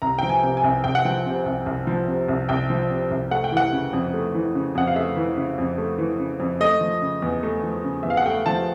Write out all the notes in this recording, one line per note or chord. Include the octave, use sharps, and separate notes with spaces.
C2 A#5
F3 G5
G#5
C3
G#5
C2
C2 G5
F#5
F3 G5
C3
C2
C2
F3
C3
C2
C2 G5
F3
C3
C2
A3 F#5
G5
E3 F#5
C#3
F2
A3
E3
C#3
F2 F#5
F5
A3 E5
E3
C#3
F2
A3
E3
C#3
F2
A3 D#5
F3
C#3
E2
A3
F3
C#3
E2 E5
F5
F#5
A3 G5
F3 A5